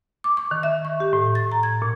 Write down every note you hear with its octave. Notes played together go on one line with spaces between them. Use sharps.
D6
C#6
D#3
E5
C#6
G4
A2
A6
A#5
G#6
A#2